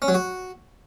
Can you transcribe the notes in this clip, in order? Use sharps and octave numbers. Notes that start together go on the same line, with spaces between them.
C#4
F#3
F#4